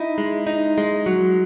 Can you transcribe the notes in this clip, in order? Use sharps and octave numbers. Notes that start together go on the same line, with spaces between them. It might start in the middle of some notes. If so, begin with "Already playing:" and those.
Already playing: D#4 E4
G#3
D#4
G#3
F#3